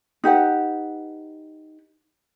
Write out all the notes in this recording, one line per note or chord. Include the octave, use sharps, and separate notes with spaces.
D#4 G4 B4 F#5